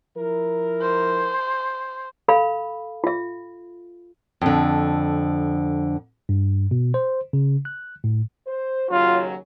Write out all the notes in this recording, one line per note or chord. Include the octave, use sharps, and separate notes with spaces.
F3 E4 A#4
C5
A4 F5 B5
F4 E5
F2 D3
G2
B2
C5
C#3
F#6
A2
C5
D#2 C#3 F#3 F4